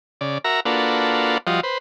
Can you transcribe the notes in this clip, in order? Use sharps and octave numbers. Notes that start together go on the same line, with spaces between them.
C#3 D5
F#4 A#4 E5 A#5
A#3 D4 F4 F#4 A4 B4
F3 G3 F4 F#4 D#5
B4 C5